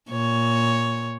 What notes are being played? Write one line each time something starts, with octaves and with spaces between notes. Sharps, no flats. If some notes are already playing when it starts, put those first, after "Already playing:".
A#2 C#5